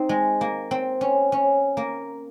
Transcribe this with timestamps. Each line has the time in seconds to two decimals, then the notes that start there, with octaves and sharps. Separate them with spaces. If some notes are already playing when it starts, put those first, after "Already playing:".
Already playing: C4 D#4
0.09 G#3
0.41 A#3
0.71 C4
1.01 C#4
1.32 C#4
1.77 A#3